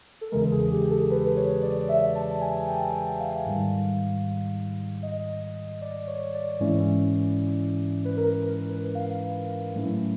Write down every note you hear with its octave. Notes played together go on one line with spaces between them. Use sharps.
A4
E2 C#3 E3 G#3 A#4
G#4
G4
G#4
A4
B4
C#5
D5
E5
A5
G#5
G5
F5
G#2 D#3 G3
D#5
D5
C#5
D5
G#2 E3 G#3 C#4 E4
B4
A#4
A#4
B4
F5
A2 F#3 A3 C#4 E4